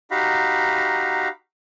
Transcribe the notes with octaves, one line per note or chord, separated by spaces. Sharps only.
D#4 F#4 G4 F5 A#5 B5